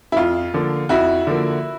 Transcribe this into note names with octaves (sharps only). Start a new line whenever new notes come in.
E4
F2 F4
D3 F3 A#3
F2 E4 F#4
D3 F3 A#3